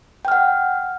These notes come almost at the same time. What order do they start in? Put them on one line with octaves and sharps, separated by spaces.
G5 F6 F#5